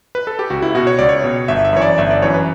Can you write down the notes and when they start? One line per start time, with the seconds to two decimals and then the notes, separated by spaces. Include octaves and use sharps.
0.15 B4
0.27 A4
0.39 G4
0.50 C#2 F#4
0.62 E4
0.75 B2 F#4
0.87 C#5
0.99 C#2 D5
1.09 C#5
1.24 B2
1.48 G1 E5
1.65 E5
1.73 F#2 E3 C#5
1.82 D5
1.98 G1 E5
2.11 D5
2.22 F#2 E3 C#5
2.34 B4